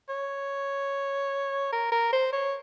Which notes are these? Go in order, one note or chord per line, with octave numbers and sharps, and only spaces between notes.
C#5
A#4
A#4
C5
C#5